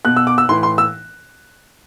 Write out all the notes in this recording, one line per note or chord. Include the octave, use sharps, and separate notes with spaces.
B2 F#6
E6
D6
E6
A2 E3 C6
C6
E6